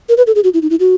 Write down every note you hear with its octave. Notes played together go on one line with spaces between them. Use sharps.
A#4
B4
A4
G#4
F#4
E4
D#4
E4
F#4